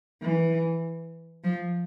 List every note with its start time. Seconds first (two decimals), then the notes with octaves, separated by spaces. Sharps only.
0.22 E3
1.44 F3